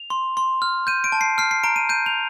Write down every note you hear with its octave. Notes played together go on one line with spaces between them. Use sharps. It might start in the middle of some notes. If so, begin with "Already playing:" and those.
Already playing: F7
C6
C6
F6
G6 D#7
D7
A5
C7
F6 C7
C7
A#5 D7
D#7
G6 D#7
F7